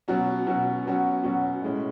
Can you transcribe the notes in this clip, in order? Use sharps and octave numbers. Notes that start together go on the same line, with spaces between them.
B2 F#3 C#4 F#4
B2 F#3 C#4 F#4
B2 F#3 C#4 F#4
B2 F#3 C#4 F#4
A2 G#3 C#4